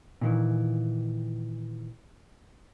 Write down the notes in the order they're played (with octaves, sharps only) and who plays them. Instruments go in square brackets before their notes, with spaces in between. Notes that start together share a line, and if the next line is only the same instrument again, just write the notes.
[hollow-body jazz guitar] A#2 D#3 E3